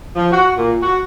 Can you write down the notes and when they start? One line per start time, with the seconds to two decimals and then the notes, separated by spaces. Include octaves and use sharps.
0.16 F3
0.32 F#4
0.57 A#2
0.82 F#4